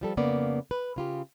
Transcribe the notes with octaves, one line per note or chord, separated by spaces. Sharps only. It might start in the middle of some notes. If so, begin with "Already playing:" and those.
F3 G3 A4
F2 C#3 A#3 B3 D5
B4
C#3 F4 G4